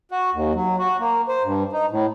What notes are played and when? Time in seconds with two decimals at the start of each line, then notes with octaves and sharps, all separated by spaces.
0.11 F#4
0.34 D#2
0.55 F#3
0.79 F#4
1.00 A#3
1.28 C5
1.44 G2
1.73 D#4
1.91 A2